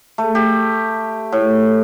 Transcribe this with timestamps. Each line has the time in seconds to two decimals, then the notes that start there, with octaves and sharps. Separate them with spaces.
0.18 A3
0.35 G4
1.32 A2